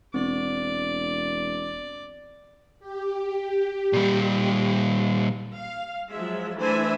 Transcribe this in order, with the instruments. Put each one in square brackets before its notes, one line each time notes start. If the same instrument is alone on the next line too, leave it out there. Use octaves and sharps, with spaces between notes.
[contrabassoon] E1 [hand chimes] C4 [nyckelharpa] D5
[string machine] G4
[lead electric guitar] A#2 G3
[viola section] F5
F3 F#3 G#3 E5
E3 A3 D4 C5 E5 G#5